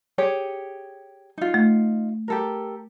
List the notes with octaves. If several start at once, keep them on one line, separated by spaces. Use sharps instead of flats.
G4 G#4 C#5
D#4 F4
A3
G4 A4 A#4